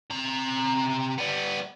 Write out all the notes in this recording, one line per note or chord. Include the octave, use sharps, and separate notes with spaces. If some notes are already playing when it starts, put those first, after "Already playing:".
C3 A#5
G3 B3